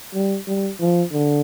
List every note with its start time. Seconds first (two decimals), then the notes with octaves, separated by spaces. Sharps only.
0.15 G3
0.47 G3
0.80 F3
1.13 D3